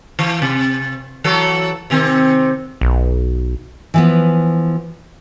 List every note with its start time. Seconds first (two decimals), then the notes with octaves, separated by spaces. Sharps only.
0.19 E3
0.42 C3
1.24 E3 F#3 A4
1.90 C3 D#3 C4
2.81 B1
3.94 E3 F3 B3